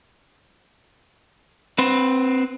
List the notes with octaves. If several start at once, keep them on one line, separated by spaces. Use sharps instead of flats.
C4 B4